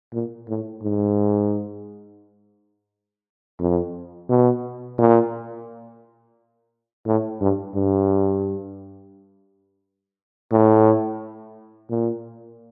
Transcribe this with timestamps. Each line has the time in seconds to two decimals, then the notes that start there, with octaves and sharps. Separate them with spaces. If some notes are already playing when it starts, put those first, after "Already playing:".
0.13 A#2
0.48 A2
0.83 G#2
3.60 F2
4.29 B2
4.98 A#2
7.06 A2
7.41 G2
7.75 G2
10.52 A2
11.90 A#2